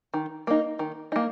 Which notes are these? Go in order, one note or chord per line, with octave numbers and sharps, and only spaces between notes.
D#3
A#3 D#4
D#3
A#3 D#4